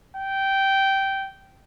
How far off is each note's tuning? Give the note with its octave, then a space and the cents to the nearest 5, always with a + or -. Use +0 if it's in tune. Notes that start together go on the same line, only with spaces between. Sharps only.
G5 -10